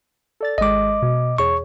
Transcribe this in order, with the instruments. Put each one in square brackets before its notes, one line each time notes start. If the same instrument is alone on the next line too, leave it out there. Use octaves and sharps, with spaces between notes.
[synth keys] A4 D5 A6
[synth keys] G#1 G#3 [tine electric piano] D#5 D6
[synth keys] B2
[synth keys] E2 G#4 C#5 [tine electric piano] C#6